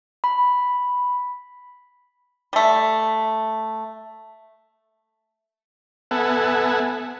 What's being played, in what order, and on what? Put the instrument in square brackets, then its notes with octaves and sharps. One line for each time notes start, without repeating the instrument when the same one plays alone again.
[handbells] B5
[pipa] G3 A3
[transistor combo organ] B3 A4 E5 F#5 G#5